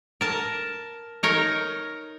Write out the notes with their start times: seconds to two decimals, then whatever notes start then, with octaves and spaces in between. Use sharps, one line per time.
0.21 A#4 A5
1.23 D#4 A#4 C#5